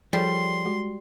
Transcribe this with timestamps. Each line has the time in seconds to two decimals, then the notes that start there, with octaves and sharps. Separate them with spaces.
0.13 F3 G3 G#4 A4 C#5 C6
0.65 G#3 F#4